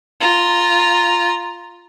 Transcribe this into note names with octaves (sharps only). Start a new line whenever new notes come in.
F4 A#5